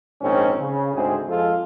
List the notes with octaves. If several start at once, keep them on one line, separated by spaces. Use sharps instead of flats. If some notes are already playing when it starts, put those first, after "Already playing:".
A#1 G#2 D#3 C4 C#4
C#3
D2 G#2 C4 G#4
F2 F3 G#3 F4 A4